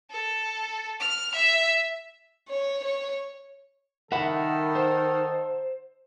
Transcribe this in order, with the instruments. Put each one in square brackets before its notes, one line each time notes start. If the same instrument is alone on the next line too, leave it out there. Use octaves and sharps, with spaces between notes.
[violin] A4
F6
E5
C#5
C#5
[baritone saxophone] D#3 [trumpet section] D#4 A4 [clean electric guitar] A#4 E5 B5 [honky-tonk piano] F#5
[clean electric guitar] C5